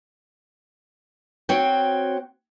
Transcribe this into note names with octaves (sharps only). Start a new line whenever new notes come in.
C4 F#4 C#5 G5